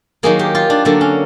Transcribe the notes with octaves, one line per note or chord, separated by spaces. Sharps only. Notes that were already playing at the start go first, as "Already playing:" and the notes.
D#3 F#3 A#3 G#4
G4
F4
D4
D3 F#3 A#3 D4
C#4